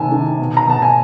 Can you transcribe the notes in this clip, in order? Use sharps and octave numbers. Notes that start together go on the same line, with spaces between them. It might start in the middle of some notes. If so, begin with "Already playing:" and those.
Already playing: C3 D#3 G#5 A5
D#3
B2
A#5
B2 A5
G#5